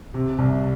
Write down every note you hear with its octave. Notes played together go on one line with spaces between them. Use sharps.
C3
C2